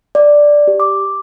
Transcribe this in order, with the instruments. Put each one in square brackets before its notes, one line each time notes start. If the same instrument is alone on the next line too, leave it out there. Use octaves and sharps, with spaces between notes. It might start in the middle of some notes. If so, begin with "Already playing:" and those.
[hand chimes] D5
G4
D6